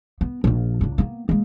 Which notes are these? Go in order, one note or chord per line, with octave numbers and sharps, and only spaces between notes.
B3
A#1 F3
C#2 D4
A#3 B3
G#3 A#3